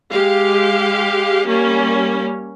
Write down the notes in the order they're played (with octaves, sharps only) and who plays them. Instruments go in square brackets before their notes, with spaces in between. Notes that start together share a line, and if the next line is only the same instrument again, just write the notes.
[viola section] G#3 G4 F5
G3 A#3 C#4